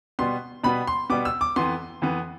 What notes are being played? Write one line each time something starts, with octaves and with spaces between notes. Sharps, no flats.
B2 G3 B3 C6
B2 G3 B3 B5
C6
B2 G3 B3 D6
E6
D6
F2 E3 B3 C6
F2 E3 B3